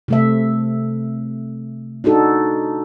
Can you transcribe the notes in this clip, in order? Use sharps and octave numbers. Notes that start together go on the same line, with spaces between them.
C3 A3 E5
D4 D#4 F#4 A4